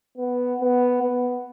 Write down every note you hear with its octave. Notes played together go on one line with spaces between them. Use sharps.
B3
B3
B3